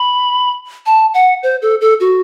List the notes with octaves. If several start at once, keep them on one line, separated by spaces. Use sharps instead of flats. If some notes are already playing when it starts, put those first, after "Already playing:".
Already playing: B5
A5
F#5
C5
A4
A4
F#4